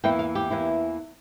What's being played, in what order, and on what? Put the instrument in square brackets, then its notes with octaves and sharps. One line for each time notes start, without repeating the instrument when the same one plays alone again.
[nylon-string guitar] E2 E3 A#3 E4 G5
F5
G4
E2 E3 A#3 E4